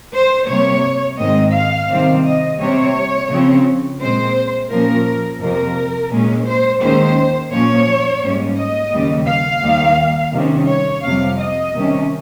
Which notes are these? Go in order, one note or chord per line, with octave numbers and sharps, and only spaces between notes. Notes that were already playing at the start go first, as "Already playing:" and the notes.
C5
C3 G3 A#3 C#5
G#2 D#3 G#3 C4 D#5
F5
C3 D#3 G3 C4
D#5
C3 G3 C4 C#5
C#3 F3 C4
A#2 G#3 C4 C5
A#2 F3 A#3 C#4 A#4
F2 C3 F3 A#4
A#2 G#3 C#4
C5
D#2 D#3 G#3 C#4 C5
A#2 F3 A#3 C#4 C#5
G#2 G3 A#3 C#4
D#5
D#2 C#3 G3
F5
D#2 D#3 G3 A#3
C3 D#3 G3 C#4
C#5
F2 C3 G3 F5
D#5
C3 D#3 G3 C#4